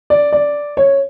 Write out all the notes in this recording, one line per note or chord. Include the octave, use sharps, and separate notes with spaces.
D5
D5
C#5